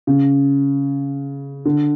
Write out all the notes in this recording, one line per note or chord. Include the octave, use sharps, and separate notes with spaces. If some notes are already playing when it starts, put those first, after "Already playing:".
C#3
D3